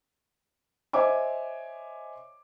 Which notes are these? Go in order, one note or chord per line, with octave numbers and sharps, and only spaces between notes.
C5 C#5 D#5 E5 G#5 D6